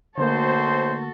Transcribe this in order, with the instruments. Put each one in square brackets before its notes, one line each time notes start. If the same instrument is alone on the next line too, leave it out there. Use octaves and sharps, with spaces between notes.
[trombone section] B1 C5 [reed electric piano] D3 A3 A#3 [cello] F#4 A4